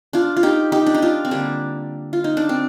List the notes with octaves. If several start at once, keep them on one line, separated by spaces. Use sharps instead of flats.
D4 F4
F4
D#4 G4
D#4 G4
D4
D#4
D4 F4
C4
D3 G3 A#3 D4
F4
D#4
D4
C4